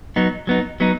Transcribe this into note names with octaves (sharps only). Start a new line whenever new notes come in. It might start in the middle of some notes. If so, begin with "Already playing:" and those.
F#3 B3 D#4
F#3 B3 D#4
F#3 B3 D#4